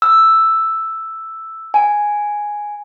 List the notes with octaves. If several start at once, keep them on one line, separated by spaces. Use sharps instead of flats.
E6
G#5